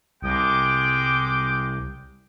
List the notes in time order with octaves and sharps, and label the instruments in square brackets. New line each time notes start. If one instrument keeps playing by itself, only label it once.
[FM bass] C2 [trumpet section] G#3 G5 D6